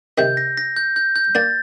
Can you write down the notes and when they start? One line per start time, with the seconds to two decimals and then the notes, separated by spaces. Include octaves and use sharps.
0.18 C3 D#3 G6
0.37 A#6
0.57 A#6
0.77 G6
0.96 G6
1.16 G6
1.35 A#3 D4 A6